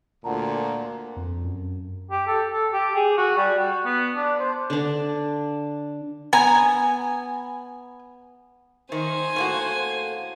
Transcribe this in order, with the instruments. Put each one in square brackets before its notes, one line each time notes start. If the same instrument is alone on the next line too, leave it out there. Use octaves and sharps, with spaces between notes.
[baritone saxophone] D2 [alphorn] A#2 [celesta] F#5 A5 A#5
[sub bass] F2
F#2
[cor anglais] G4
A4
A4
G4
G#4
F#4
G3
F#4
B3
D4
C5
[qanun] D3 D4
[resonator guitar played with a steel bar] B3 A#5 [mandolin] G#5
[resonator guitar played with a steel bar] D#3 [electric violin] C5 [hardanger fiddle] G#5
[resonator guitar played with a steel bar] A2 A#3 F#4